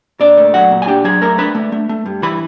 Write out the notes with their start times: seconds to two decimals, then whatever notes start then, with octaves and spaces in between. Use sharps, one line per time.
0.20 A#2 D4 D5
0.37 A3
0.54 F#3 F#4 F#5
0.71 A#2
0.82 G#5
0.87 D4 G4 G5
1.04 F#3 G#4 G#5
1.21 A3 A#4 A#5
1.38 D4 B4 B5
1.55 A3
1.72 A3
1.89 A3
2.06 G2
2.22 E3 B4 B5